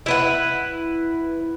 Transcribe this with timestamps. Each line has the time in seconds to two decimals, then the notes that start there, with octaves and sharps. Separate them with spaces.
0.06 E4 B4 F#5